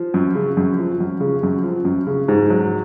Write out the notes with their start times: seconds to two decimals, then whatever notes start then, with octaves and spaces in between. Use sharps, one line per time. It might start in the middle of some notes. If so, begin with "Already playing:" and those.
Already playing: F3
0.14 F#2
0.35 C#3
0.57 F#2
0.79 F3
1.00 F#2
1.21 C#3
1.43 F#2
1.63 F3
1.85 F#2
2.07 C#3
2.28 G#2
2.50 F#3